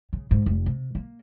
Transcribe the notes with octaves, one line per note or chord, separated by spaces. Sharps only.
C#3
G#2
F1
C3
A#3